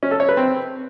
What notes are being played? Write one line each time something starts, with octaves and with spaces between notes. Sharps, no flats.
C#4
A4
C#5
B4
C4